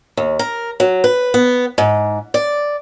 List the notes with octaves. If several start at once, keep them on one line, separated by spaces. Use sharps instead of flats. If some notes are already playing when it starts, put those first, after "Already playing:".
D#2
A#4
F#3
B4
B3
G#2
D5